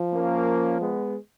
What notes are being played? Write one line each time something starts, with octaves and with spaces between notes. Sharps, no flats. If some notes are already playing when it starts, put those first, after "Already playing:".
Already playing: F3
A#3 C#4
G#3 B3